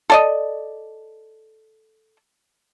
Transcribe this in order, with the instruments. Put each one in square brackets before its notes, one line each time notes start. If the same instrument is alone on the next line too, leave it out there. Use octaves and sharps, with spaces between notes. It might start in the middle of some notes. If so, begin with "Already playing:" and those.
[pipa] A4 D5 D#5